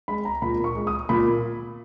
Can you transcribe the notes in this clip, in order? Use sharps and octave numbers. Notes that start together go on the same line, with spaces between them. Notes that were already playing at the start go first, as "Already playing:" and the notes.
G#3 B5
A#5
A#2 B5
C#6
G#3
D#6
A#2 B5